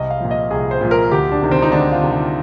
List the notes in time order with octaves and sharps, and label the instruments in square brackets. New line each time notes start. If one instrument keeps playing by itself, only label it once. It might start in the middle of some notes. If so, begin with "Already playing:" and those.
Already playing: [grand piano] C2 D#5
F5
A#2 F3
D#5
C2 G#4
C5
A#2 F3
A#4
D2 G4
D4
C3 D#3
C4
D#4
D2 D4
F4
C3 D#3
F4